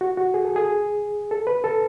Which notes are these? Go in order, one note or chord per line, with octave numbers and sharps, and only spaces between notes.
F#4
F#4
G#4
A4
G#4
A4
B4
A4